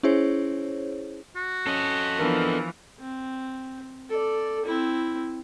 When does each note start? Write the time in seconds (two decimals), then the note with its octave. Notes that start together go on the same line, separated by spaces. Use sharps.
0.03 C#4 E4 G#4 C5 C#5
1.36 F#4
1.66 C#4 A4 D#5
2.19 E3 F3 B3 D4 A#4
3.00 C4
4.09 A4 D5
4.66 C4 E4